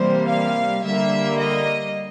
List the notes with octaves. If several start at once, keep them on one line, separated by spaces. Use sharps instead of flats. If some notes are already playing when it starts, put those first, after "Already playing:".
Already playing: C3 E3 G3 A#3 C5
F5
D3 G3 A#3 E5
D#5